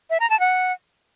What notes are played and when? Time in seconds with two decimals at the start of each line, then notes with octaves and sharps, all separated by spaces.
0.10 E5
0.20 A#5
0.30 A5
0.40 F#5